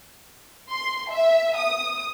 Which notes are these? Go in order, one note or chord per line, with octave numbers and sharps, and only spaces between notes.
C6
E5
D#6